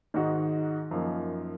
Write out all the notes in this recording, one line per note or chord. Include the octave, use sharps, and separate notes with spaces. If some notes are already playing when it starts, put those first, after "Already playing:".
G#2 D#3 G#3 D#4 F#4
F#2 F3 A#3 D#4